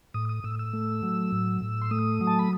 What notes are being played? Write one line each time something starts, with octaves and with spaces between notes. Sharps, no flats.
A2 D#6
D#6
A2 E6
E6
A3
F#3
A2
A2
C6
A3 D#6
F#3
A5
B5